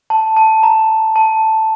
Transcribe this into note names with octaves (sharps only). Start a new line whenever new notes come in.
A5
A5
A#5
A5